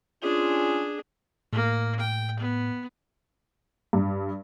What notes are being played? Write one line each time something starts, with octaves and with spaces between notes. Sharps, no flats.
C#4 D4 F4 G#4
A2 A#3
G5
B3
G2